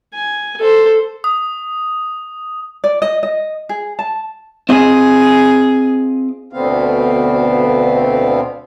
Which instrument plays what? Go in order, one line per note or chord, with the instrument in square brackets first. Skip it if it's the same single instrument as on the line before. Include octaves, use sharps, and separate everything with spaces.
[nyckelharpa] G#5
A4 C5
[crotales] D#6
[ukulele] D5
D#5
D#5
G#4
A5
[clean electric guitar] C4 F4 D#5 [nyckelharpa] G#4
[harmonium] D2 B2 D3 B3 C4 F5